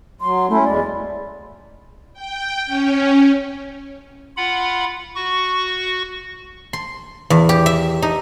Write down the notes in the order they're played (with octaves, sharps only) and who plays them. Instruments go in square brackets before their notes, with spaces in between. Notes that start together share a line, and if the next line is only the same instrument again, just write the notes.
[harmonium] F#3 [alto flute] C6
[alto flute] A3 [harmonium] C#4 E4
[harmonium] E2 G#3 [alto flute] D5
[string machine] G5
C#4
[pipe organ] F4 F#5 B5
F#4 C#6
[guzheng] C6
E2
G4
E5
D#4